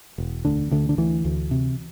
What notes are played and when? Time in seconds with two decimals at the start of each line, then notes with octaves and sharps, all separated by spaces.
0.18 E1
0.45 D2 D3
0.71 D2 D3
0.89 D3
0.98 D2 E3
1.24 D2
1.51 C3